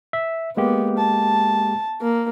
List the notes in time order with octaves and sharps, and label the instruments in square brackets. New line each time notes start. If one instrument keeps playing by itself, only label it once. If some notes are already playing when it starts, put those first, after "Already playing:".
[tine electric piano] E5
[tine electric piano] G#3 A#3 G4 [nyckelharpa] B3
[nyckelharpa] A5
A#3